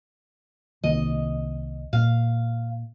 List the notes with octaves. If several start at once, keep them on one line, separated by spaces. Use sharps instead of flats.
C2 D#3 A#3 D#5
A#2 F5